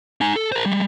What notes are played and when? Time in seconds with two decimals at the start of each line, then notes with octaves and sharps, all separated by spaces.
0.21 D#4 G#5
0.36 A4
0.52 A#4 C5
0.66 G3 G#3